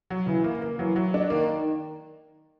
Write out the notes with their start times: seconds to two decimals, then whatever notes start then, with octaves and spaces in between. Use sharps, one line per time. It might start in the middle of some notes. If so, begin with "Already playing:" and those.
0.10 F#3
0.27 C#3 E3
0.44 A#3
0.62 A#3
0.79 E3 F#3
0.96 F#3
1.14 D4
1.30 D#3 A#3